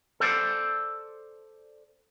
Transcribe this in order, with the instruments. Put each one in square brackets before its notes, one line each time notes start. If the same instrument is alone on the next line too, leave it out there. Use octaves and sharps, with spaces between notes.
[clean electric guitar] A4 C5 D5